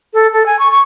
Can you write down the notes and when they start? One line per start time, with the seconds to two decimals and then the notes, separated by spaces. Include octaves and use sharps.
0.14 A4
0.33 A4
0.46 G#5
0.59 C#6
0.71 C#6